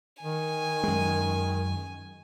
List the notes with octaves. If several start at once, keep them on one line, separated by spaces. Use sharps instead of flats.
D#3 G#5
F#2 G#3